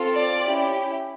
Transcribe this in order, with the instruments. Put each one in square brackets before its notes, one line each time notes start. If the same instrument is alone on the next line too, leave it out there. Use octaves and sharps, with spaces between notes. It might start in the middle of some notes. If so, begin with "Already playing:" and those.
Already playing: [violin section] C4 F4 A4
D5
C#4 E4 G4